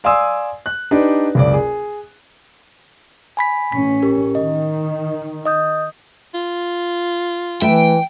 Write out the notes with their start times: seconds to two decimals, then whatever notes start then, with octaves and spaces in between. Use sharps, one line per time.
0.04 D5 F5 G#5 C6 D#6 E6
0.66 F#6
0.91 D4 D#4 G4 B4 D5
1.35 F#1 C#2 D5
1.54 G#4
3.37 G#5 B5 B6
3.72 A1 C#4 B6
4.02 G4 A#4
4.35 D#3 D#5
5.45 D#5 D#6 G6
6.34 F4
7.62 E3 A3 B4 E5 G5